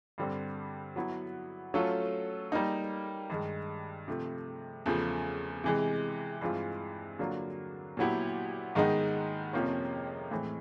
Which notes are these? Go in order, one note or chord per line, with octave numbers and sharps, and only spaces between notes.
G2 D3 G3 C4
F#3 B3 E4
F#3 A3 C#4 F4 A4
G3 A#3 D#4
G2 D#3 G#3
C3 F3 A3
E2 C#3 F3 A3
C3 E3 G#3
G2 E3 G#3 C4 F4
D3 F#3 A#3 D4 F4
A#2 F#3 B3 E4 G4
G#2 D#3 G#3 B3 D#4
F2 C3 F3 A#3 C#4
A2 E3 G#3 C4